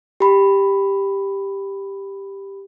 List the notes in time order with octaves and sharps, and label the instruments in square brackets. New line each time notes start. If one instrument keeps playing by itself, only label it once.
[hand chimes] G4 B5